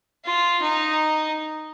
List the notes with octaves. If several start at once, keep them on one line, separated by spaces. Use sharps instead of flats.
F4
D#4